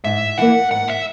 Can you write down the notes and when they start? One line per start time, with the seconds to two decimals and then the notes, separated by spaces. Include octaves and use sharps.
0.04 G#2 E5
0.38 E3 A#3 F#5
0.71 G#2 F#5
0.89 E5